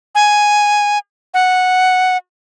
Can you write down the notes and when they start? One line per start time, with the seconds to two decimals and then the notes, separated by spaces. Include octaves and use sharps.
0.15 G#5
1.34 F#5